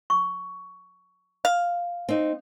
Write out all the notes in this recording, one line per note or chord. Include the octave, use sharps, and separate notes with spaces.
C#6
F5
C4 D#4